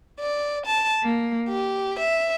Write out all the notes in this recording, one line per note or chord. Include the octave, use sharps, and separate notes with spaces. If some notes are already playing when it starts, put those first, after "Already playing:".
D5
A5
A#3
G4
E5